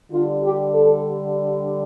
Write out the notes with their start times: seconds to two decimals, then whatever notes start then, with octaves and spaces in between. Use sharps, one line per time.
0.11 D3 G3 D4 F4
0.42 G4
0.72 A4